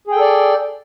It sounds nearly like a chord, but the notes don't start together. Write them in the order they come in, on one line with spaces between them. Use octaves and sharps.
G#4 G5 A4 D5